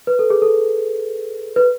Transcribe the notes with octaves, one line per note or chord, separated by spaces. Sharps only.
B4
A4
G#4
A4
B4